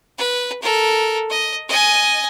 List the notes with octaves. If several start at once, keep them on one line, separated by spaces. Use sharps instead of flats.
B4
A4 A#4
D#5
D#5 G#5